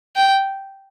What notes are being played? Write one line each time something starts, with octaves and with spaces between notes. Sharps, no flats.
G5